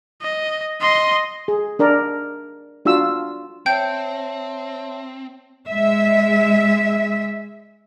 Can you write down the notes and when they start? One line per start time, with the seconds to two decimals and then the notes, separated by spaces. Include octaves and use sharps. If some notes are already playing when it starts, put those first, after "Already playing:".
0.22 D#5
0.81 D#5 C6
1.48 G#4
1.79 D4 A#4 D5
2.85 D4 F4 F#4 E6
3.66 C4 C#5 E5 G5 A5 G6
5.68 G#3 E5